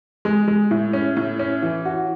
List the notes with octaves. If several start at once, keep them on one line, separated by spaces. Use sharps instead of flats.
G#3
G#3
A2
C#4
A2
C#4
E3
F#4